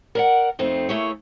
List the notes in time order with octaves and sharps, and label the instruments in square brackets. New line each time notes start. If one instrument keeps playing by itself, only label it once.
[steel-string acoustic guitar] A#4 D5 F#5
F2 A3 C4 D#4
A3 A#3 E4 G#4 C#5